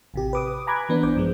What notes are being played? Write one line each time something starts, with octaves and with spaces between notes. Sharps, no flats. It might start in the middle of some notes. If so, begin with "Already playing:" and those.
A1 C3 G4
B4 D6 D#6
G#5 A#5 B5 D6 F#6 G#6
E3 B3 D4
A#1 C5 D6 G6
G2 F3 G#3